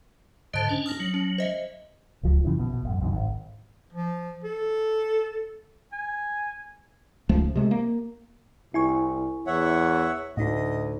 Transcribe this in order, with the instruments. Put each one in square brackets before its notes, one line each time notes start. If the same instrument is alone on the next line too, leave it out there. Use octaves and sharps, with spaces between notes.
[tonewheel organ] G#2 D3 C5 [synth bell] D#5 A5
[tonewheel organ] C#4 D4
[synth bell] D#6 F6 A#6
[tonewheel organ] F#3
[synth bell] C#4
C5 D#5 E5
[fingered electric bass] D1 C#2 F3
F#2 C#3 E3 F3
A#1 B2
A1 F#2
B1 F#2 C3 D#3
G#1
[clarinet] F3
A4
G#5
[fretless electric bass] D#1 C#2 F3 A3
C3 G#3 A3
A#3
[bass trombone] C2 [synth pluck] E4 G#5 C#6
[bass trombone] E2 [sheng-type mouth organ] C#5 E5 F#5
[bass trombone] D2 [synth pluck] A2 D#4 [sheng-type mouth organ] D#5